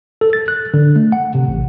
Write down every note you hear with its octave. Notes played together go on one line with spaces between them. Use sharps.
A4
A6
F#6
D3
A3
F#5
C3
A1